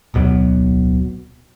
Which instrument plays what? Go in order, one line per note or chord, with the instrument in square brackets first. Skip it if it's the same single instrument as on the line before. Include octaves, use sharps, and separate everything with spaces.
[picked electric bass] D1 B1 B2 F#3